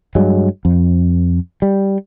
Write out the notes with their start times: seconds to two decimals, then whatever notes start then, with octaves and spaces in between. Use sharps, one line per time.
0.15 G2 F#3 G#3
0.65 F2
1.62 G3